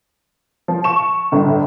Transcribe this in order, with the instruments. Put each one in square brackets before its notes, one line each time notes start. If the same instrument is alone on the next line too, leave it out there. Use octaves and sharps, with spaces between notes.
[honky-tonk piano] F3
C#6 E7
G1 A2